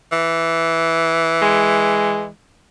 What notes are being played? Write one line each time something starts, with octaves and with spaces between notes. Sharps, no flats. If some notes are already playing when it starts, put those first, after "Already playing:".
E3
G#3